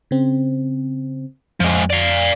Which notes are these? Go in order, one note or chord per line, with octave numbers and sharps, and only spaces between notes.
C#3 C4
F2 F3 G#3
D5 F5